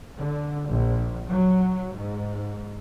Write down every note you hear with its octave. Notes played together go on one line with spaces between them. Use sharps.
D3
A#1
F#3
G#2